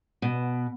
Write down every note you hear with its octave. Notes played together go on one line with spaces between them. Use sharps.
B2